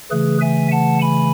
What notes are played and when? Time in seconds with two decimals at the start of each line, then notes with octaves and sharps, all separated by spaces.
0.11 C#3 E3 A3 G#4 B4
0.41 E5 G#5
0.72 F#5 A5
1.01 G#5 B5